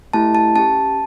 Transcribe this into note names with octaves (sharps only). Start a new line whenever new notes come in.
A3 E4 G4 A5
A5
C#4 G4 A5